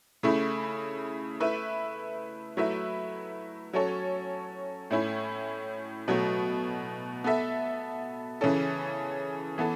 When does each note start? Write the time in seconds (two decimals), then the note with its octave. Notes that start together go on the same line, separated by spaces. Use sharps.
0.23 C#3 A3 E4
1.40 A3 E4 B4 E5
2.57 F#3 A3 E4 B4 E5
3.73 F#3 C#4 A4 C#5
4.90 A2 A3 C#4 E4
6.08 B2 F#3 A3
7.24 B3 A4 E5
8.41 C#3 E3 C#4 A4
9.58 E3 B3 A4